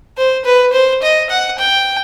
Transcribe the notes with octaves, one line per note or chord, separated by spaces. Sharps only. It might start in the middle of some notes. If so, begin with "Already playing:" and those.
C5
B4
C5
D#5
F#5
G5